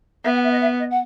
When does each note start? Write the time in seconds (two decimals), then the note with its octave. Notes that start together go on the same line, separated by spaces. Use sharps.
0.24 B3 E5
0.34 F#5
0.43 E5
0.51 D#5
0.61 E5
0.79 D#5
0.90 F#5